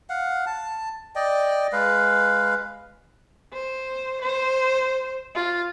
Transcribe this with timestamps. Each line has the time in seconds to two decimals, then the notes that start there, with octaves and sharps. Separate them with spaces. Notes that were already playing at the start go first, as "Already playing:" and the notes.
0.10 F5 F#5
0.46 A5
1.15 D5 D#5 G5
1.73 G#3 B4 F5
3.53 C5
4.22 C5
5.35 F4